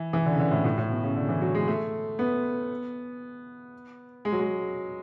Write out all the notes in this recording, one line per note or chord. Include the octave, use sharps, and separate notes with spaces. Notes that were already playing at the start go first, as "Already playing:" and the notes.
Already playing: E3
E3
D3
C#3
D3
A2
B2
A2
A2
B2
C#3
D3
E3
F#3
G#3
A3
B3
G#3
F#3
G#3